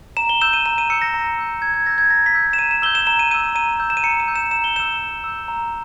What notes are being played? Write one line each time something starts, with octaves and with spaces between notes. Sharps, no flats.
A#5 E7
G7
E6 G6 E7
D#7
A#5 E7
D#7
E6 G6 C#7
A#6
A#5
E6 G6
A#5 G#6
G#6
E6 G6 A#6
G#6
A#5 A#6
B6
E6 G6
E7
A#5 D#7
E7
E6 G6 G7
E7
A#5 E7
D#7
E6 G6 D#7
A#5 D#7
E6 G6
E7
D#7
A#5 C#7
D#7
E6 G6
E7
A#5 E7
G7
E6 G6 E7
A#5
E6 G6
A#5